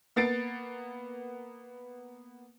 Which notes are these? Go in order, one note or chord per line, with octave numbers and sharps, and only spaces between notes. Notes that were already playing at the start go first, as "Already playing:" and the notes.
A#3 B3 A6 C7 D7